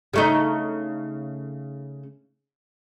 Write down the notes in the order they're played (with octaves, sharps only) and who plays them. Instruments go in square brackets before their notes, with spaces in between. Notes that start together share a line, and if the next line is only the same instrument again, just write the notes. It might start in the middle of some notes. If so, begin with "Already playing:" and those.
[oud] C#3 A3 D#4